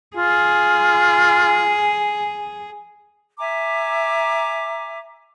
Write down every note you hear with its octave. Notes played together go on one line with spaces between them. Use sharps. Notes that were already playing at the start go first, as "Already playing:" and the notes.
F4 G#4
E5 G#5 A#5 D6